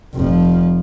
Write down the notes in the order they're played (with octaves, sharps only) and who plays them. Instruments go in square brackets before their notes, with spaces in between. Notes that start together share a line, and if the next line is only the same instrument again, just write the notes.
[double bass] F1 F3